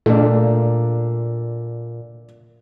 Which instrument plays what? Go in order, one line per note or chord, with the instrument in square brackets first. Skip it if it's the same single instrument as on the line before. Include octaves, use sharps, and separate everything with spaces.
[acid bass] A#2 [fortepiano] A3 D4